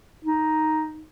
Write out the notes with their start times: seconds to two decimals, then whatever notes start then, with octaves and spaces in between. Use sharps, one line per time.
0.25 D#4